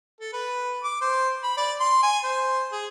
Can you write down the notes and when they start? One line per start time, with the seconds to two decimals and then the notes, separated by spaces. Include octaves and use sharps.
0.20 A4
0.33 B4
0.83 D6
1.01 C5
1.43 B5
1.57 D5
1.80 C6
2.03 G#5
2.24 C5
2.72 G#4